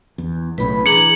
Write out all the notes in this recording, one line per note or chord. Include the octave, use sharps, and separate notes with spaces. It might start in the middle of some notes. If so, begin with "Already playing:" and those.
E2
B1 A2 C#3 B4 B5
E3 D4 G#4 A#5 C#7 F#7